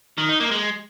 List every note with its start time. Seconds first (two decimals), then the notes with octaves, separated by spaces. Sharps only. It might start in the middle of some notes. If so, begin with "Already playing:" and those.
0.18 D#3
0.29 D#4
0.40 A#3
0.51 G#3